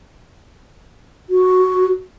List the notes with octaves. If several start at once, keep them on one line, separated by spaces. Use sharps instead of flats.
F#4